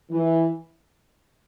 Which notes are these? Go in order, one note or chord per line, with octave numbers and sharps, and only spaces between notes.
E3